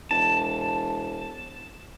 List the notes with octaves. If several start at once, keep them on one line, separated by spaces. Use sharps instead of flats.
E1 A5